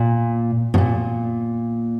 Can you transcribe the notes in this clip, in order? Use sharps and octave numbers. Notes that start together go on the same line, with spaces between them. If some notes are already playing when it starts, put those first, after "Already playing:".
Already playing: A#2
B2
A#2